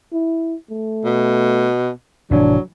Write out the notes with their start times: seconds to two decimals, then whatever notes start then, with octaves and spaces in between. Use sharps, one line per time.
0.13 E4
0.70 A3
1.05 B2
2.31 F1 A2 E3 F#3 D4